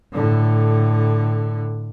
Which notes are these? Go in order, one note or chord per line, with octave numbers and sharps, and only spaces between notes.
A2 D3